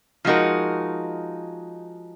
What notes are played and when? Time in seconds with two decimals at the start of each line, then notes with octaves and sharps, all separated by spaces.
0.25 F3 G#3 D#4 F#4 A#4